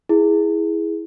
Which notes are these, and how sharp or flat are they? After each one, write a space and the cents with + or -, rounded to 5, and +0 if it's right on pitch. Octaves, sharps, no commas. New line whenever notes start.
E4 -5 G#4 +0